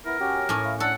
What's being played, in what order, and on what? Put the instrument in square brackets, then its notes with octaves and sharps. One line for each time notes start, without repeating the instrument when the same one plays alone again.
[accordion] B3 E4 [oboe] A#4
[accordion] C#4 F#4 G4
[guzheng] A2 C#4 [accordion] A4 D6 F6
[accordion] E4 F5
[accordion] D4 [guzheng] A4 [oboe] F#5